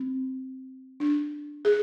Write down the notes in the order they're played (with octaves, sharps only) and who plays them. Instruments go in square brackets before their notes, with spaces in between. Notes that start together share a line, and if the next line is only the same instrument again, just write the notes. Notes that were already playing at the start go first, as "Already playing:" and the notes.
Already playing: [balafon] C4
D4
G#4